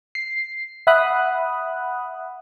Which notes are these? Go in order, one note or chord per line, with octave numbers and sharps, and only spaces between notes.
C7
E5 F#5 B5 D#6 F#6